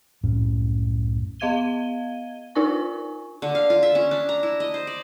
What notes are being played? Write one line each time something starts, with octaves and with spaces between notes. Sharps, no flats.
C2 F#2 A2 C#4
B3 D#5 F5 G#6 D#7 G7
D4 D#4 F4 A#4 G#5 C#6
D3
F5
F4
E5
C#4
D4
A#5
E4
D#5
C5
D5